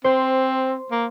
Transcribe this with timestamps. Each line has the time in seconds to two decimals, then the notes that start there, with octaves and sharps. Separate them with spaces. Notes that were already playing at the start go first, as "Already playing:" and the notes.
0.04 C4 C5
0.91 A#3